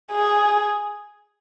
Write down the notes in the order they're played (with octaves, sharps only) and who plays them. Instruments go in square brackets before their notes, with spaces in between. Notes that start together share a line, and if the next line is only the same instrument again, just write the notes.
[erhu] G#4